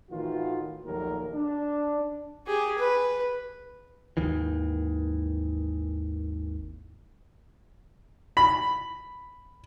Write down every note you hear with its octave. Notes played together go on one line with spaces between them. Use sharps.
A2 D#3 E3 F4 F#4
A#1 D#2 F#3 A3 A#3 A#4
D4
G4 G#4
B4
G#1 D#2 D#3 E3
B5